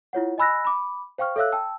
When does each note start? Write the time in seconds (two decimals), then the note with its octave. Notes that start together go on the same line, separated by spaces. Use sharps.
0.13 E4 F4 C#5 F#5
0.38 D#5 G#5 B5 E6 F#6 A#6
0.65 B5 D6
1.18 C5 F5 G5 C#6 F6
1.36 A4 C#5 E5 F5 E6 F#6
1.52 G5 A5 E6